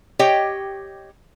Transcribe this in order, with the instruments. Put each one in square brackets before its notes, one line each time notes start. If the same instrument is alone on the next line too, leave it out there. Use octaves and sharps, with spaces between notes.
[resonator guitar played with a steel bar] G4 C#5 D#5 G5